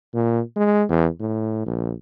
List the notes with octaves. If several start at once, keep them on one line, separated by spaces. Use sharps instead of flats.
A#2
G#3
E2
A2
A#1